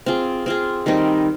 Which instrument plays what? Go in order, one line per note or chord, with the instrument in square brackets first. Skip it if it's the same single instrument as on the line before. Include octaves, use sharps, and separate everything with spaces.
[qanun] C4 F4 G#4
C4 F4 G#4
D#3 G3 C4 D#4